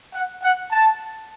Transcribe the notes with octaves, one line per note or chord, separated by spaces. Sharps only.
F#5
F#5
A5